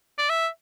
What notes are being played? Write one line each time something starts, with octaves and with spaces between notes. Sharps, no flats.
D5
E5